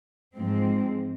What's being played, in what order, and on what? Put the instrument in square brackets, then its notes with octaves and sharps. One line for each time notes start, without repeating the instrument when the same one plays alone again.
[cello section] G#2 F3 G#3 C4